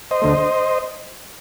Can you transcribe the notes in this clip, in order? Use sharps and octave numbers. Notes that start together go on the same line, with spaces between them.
C5 D#5
D2 D3 A3